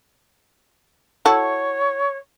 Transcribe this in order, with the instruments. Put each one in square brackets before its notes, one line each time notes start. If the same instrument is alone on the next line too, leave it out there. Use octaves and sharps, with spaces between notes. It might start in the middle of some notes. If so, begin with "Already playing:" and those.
[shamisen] E4 F#4 A4 [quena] C#5